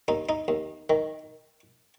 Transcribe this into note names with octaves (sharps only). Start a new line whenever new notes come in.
D#2 D#4
D#4
D#2
D#3